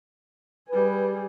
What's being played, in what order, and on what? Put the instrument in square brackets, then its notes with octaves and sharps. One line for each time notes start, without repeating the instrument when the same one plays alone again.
[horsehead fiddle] G3 G#4 [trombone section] B4